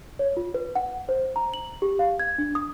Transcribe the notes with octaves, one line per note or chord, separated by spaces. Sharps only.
C#5
F4
B4
F#5
C5
A#5
F#7
G4
F5
G#6
D4
D#6